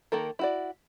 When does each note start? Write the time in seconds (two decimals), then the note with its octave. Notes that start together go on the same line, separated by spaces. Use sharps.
0.12 D#3 A#3 A4 A#4
0.39 E4 F#4 D5